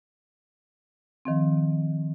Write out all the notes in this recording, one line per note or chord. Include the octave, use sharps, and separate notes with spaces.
D#3 F3 C4